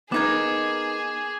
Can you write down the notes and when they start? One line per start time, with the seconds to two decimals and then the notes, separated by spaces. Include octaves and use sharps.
0.12 B3 D#4 G#4 A#4 D6 G#6